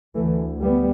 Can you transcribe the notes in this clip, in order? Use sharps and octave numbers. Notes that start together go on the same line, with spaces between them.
D2 E3 A3
G3 B3